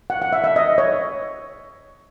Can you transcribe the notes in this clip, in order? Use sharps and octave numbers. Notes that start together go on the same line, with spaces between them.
F#5
F#5
E5
E5
D#5
C#5